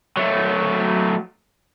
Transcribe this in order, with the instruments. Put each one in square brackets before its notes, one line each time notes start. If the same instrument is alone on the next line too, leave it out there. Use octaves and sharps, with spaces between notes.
[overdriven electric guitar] F#3 A3